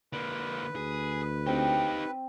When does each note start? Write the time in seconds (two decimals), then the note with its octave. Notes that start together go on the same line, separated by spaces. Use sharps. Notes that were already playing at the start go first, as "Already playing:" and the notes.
0.13 D3 A#3 B4
0.76 D2 G#4
1.47 C4 D#4 G4